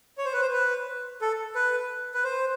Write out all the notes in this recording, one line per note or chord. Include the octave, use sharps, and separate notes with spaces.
C#5
C5
B4
C5
B4
A4
B4
B4
C5